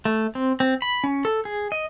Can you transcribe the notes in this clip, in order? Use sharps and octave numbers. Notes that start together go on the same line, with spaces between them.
A3
C4
C4
B5
C#4
A4
G#4
D#5